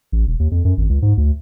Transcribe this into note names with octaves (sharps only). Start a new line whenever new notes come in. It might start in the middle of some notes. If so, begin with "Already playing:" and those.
A1
E1
D#2
F2
F#2
G#1
C#2
G#2
D2